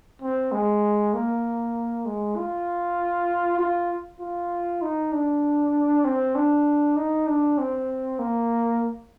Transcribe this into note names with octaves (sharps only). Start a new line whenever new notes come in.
C4
G#3
A#3
G#3
F4
F4
F4
D#4
D4
C4
D4
D#4
D4
C4
A#3